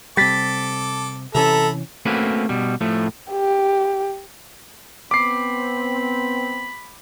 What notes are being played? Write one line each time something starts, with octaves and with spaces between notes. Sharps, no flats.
C3 G3 A4 D6 A6 B6
C3 E3 C#4 A4 E5 A#5 B5
A3 A#3 C4 C#4 F#4 B4
B2 G3
A2 F3 A3
G4
B3 C4 B5 D6 C7